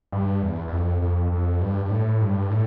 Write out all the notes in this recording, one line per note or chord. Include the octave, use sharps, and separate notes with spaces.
G2
E2
E2
F2
F2
F2
G2
G2
A2
G2
A2